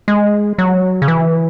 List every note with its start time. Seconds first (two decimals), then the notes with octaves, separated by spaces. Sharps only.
0.08 G#3
0.58 F#3
1.02 C#3
1.08 E3